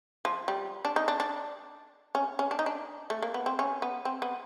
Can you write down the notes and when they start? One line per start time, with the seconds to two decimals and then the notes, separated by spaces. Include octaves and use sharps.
0.25 F3
0.48 G3
0.85 D4
0.96 D#4
1.08 D4
1.20 D4
2.15 C#4
2.39 C#4
2.51 D4
2.59 D#4
2.66 D4
3.10 A3
3.22 A#3
3.34 B3
3.46 C4
3.59 C#4
3.82 B3
4.05 C4
4.22 B3